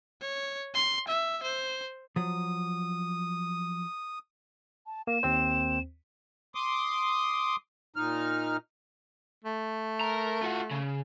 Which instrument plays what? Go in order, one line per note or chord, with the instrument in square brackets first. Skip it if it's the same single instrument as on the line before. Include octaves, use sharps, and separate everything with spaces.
[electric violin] C#5
C6
E5
C5
[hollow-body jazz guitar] F3 F#3 [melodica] D#6
[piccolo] A5
[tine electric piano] A#3 [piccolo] E7
[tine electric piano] D#2 C4 C5
[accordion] C6 D6 D#6
A#2 D#4 F6
[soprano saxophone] A3
[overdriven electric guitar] A#4 A#5
F4 F#4
C#3